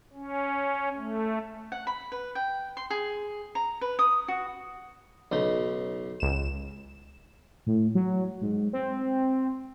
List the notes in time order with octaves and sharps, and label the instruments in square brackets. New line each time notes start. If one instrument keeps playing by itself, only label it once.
[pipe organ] C#4
A3
[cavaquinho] F#5
B5
B4
G5
C6
G#4
A#5
B4
D#6
F#4
[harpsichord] B1 C#3 D#4
[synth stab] C#2 E7
[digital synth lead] A2
F#3
G#2
C4